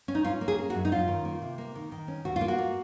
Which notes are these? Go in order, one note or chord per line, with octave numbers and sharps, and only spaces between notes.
C#4
D#4
C#4 F4
A#3
G#4
A#3
F#4
F#2
D#4
C#4 F4
D#3
A#3
C3
A#3
D#3
D#3
C#4
D#2 F#4
F4
A#3
F#4
A#3